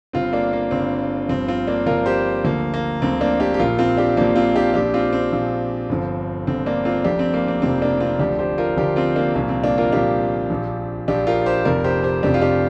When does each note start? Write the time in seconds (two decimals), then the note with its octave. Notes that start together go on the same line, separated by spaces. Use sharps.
0.13 G1 G2 D3 C4 F4
0.33 A#3 D4
0.53 A#3
0.71 G1 G2 D3 C4
1.29 G1 G2 F3 C4
1.48 C4 F4
1.67 A#3 D4
1.86 G1 G2 F3 F4 A#4
2.06 G4 C5
2.44 D2 D3 F3 A#3
2.74 A#3
3.02 D2 D3 F3 C4
3.21 A#3 D4
3.40 D4 G4
3.54 G4
3.59 A#1 A#2 F3 F4 A#4
3.78 C4 F4
3.97 D4 G4
4.17 A#1 A#2 F3 A#3 D4
4.36 C4 F4
4.55 D4 G4
4.74 A#1 A#2 F3 D4 G4
4.94 C4 F4
5.13 C4
5.32 A#1 A#2 F3
5.89 G1 G2 D3 F3
6.47 G1 G2 D3 F3 C4
6.66 A#3 D4
6.85 C4 F4
7.04 F1 F2 C3 F3 D4 G4
7.19 C4
7.34 A#3
7.48 C4
7.62 F1 F2 C3 F3 C4
7.81 A#3 D4
8.00 C4 F4
8.19 D2 D3 F3 D4 G4
8.39 G4 C5
8.58 F4 A#4
8.77 D2 D3 F3 D4 G4
8.96 C4 F4
9.16 A#3 D4
9.35 C2 A#2 F3 A#3 D4
9.49 C4
9.64 A#3 D4
9.78 F4 A#4
9.92 C2 A#2 F3 D4 G4
10.50 A#1 A#2 F3
11.08 A#1 A#2 F3 D4 G4
11.27 F4 A#4
11.46 G4 C5
11.65 F1 F2 C3 F3 A#4 D5
11.84 G4 C5
12.03 G4 C5
12.23 F1 F2 C3 F3 D4 G4
12.34 F4
12.41 D4 G4